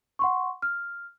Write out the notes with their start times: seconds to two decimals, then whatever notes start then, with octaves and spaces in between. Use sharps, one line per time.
0.19 F#5 C6 C#6
0.62 F6